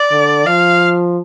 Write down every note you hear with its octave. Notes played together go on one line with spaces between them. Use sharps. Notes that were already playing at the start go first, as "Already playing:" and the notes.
Already playing: D5
D3
F3 F5